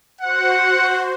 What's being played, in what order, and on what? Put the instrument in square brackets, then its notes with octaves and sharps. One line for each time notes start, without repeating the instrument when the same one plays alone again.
[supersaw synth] F#4 C5 [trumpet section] F#5